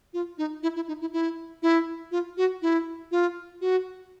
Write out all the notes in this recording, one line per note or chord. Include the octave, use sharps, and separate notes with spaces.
F4
D#4
E4
E4
D#4
E4
E4
E4
F4
F#4
E4
F4
F#4